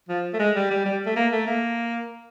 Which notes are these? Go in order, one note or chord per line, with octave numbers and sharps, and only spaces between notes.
F3
A3
G#3
G3
G3
G3
A3
A#3
A3
A#3